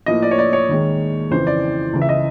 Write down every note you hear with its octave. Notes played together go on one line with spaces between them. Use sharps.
A2 F3 A#3 D#5
D5
C#5
D5
C#5
D#2 D#3 G#3
F2 C#3 E3 C5
D5
C#2 C#3 E3
E5
D#5